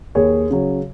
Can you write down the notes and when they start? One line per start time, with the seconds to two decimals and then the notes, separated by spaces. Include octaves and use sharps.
0.15 D#2 G#4 C#5
0.50 C#3 F#3